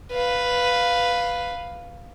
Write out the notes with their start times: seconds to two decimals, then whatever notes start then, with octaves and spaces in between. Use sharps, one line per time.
0.12 B4 F5